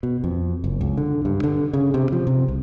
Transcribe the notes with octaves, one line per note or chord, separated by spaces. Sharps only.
B2
F2
F#1
C#2
D3
G2
D3
C#3
C3
F3
C3
C2